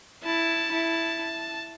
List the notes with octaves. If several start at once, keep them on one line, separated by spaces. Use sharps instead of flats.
E4 A5
E4